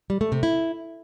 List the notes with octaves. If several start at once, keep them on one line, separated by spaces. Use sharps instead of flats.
G3
A3
C3
E4